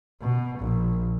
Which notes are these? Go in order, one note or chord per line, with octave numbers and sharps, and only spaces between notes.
B2
A#1